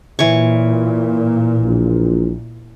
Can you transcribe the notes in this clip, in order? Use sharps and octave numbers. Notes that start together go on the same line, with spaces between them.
A#2 E3 C#5 C#6
A#1